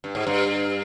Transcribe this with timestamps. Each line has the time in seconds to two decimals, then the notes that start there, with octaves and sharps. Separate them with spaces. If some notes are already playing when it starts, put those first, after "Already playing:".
0.04 G2
0.15 G#2
0.27 G2